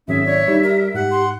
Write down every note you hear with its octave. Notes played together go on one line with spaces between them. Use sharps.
G#1 F#3 C#4 G#4 E5
C#5 D5
G3 D#4
G4 A#4
G#2 G4 F#5
C6